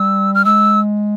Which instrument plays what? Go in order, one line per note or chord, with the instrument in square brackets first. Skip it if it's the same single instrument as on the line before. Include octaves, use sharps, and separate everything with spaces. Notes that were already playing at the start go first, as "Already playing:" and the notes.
Already playing: [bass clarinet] G3 [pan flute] E6
[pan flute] F6
[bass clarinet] G#3 [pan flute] E6